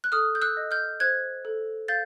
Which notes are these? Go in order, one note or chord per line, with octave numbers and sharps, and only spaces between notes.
F#6
A4 D#6 F6
G6
E6 F#6
D#5
F6 G6
C5 F#6 G#6
A4
F5 G6 A6